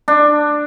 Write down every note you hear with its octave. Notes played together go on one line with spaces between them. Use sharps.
D4